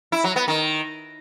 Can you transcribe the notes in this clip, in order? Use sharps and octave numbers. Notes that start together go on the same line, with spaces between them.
E4
F#3
B3
D#3